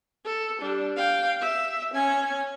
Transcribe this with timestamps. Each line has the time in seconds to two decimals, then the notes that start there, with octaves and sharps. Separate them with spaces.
0.25 A4
0.61 G3 D4
0.97 F5 G5
1.41 E5
1.94 C#4 G#5